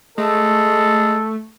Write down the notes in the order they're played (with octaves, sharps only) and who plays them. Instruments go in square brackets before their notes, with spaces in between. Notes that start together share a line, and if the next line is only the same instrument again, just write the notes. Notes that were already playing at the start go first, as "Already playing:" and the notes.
[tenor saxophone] G#3 [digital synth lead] A3 [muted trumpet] A4